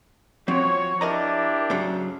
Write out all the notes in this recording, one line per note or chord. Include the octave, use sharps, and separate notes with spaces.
F3 C4 F#4 C#5
D4 E4 G4 A#4 D#5 A#5
G#2 C#3 F#3